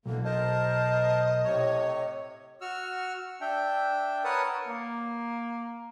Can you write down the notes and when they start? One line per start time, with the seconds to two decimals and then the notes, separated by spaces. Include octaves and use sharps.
0.06 B1 D3 E3 A#3
0.25 A#4 C5 D#5 A5
1.44 A2 C3 C#5
2.61 F#4 C#6 E6 F6
3.41 D4 E5 G5
4.24 A#4 B4 C#5 F#5 A5 D#6
4.68 A#3